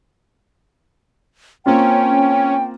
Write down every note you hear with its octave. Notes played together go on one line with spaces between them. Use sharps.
A#3 C4 C#4 F4 G5